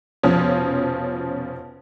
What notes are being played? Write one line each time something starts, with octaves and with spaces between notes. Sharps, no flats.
F1 B2 F3 C#4 D#6